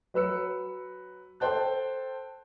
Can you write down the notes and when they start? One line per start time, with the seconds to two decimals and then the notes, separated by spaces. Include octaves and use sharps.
0.14 F#3 B4 E6 C#7
1.40 A4 C5 G5 A5 F#6